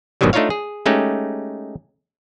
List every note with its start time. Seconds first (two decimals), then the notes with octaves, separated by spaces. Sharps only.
0.21 G#1 B2 D3 D#3 F#3 G3
0.33 A3 D4 D#4 F4 C#5 F5
0.50 G#4
0.86 G#3 A3 C#4 D#4 G4